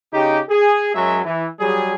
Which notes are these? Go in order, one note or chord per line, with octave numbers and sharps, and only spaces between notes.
C#3 D#4 G4
G#4
F#2 F#3 G#3 C#5 E5
E3
F#3 G3 G#4